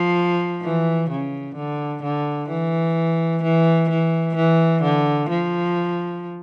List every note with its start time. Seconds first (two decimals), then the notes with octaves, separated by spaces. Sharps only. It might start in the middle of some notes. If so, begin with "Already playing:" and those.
Already playing: F3
0.62 E3
1.10 C#3
1.55 D3
2.03 D3
2.49 E3
3.43 E3
3.90 E3
4.35 E3
4.83 D3
5.29 F3